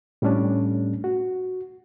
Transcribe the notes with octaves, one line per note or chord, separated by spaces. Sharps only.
A2 G3 A3 C#4 D4
F#4